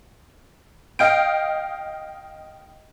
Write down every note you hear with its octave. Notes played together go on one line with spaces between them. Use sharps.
D#5 F5 G5 G6 D7